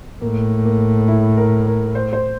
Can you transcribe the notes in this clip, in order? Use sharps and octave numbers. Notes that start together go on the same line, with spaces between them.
A2 A#3
A#3
E4
A#4
A#4
C5
C5